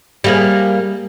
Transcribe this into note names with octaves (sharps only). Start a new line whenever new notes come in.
G3 A#3 G#4